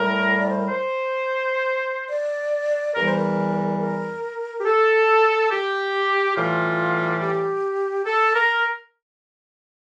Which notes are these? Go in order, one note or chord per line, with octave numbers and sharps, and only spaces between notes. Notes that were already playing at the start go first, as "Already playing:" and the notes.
Already playing: A2 G3 A#4
D5
C5
A#4
C5
D5
E2 E3 G3 A#4
C5
A#4
A#4
G4
A4
G4
A2 E3 G3 F4
G4
A4
A#4